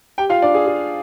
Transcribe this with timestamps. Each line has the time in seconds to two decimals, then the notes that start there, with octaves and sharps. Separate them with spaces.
0.18 G4 G5
0.29 F4 F5
0.42 D4 D5
0.54 G#4
0.66 G#4